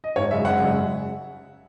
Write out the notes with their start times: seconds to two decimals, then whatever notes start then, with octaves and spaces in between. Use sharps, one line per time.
0.04 D#5
0.16 G#1 C#5
0.31 F#2 C#3 G#3 E5
0.45 G#1 F#5
0.60 F#2 C#3 G#3